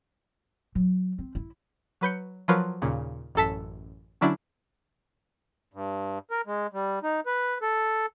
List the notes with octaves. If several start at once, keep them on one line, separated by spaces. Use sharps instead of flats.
F#3
C4
E4
F#3 B4 G6 C#7
F3 F#3 F4 A#4 B4
D#2 A#2 C#3
A1 F#2 A4 A5 B6
D3 F#3 C#4 D4 E4
G2
A#4
G#3
G3
D#4
B4
A4